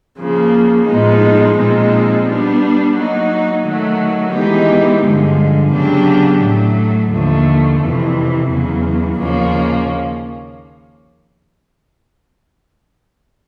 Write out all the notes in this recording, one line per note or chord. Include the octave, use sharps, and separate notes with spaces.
C#3 F3 A#3
A2 F3 G#3 B3 D#4
A#2 F3 G#3 C4 D#4
G3 B3 D4
F#3 A#3 D#4
D#3 F#3 A3
E3 G#3 B3 D#4 G4
G2 D3 F3 G#3
C#3 F#3 B3 D4 G4
A2 F#3 A3
D#2 D3 F3 A3
F2 C3 E3
E2 C#3 F#3
D#2 C#3 F3 A#3 C#4